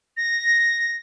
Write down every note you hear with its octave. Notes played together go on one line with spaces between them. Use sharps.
A#6